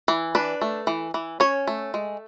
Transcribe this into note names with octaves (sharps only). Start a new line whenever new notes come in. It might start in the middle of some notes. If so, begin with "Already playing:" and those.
E3
D4 B4
A3
E3
E3
C#4 C#5
A3
G#3